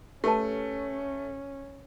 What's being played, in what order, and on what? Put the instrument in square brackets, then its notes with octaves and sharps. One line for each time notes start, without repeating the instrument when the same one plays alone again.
[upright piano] A3 [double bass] C#4 [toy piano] G4 B4 A5